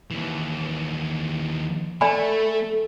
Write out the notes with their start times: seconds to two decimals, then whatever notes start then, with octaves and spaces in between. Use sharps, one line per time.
0.11 D#2 E3
2.01 A3 A4 D5 G#5 B5